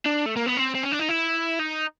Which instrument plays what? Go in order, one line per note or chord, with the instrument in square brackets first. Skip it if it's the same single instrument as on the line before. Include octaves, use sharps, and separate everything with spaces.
[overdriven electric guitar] D4
A3
A#3
B3
C4
C4
C#4
D4
D#4
E4
D#4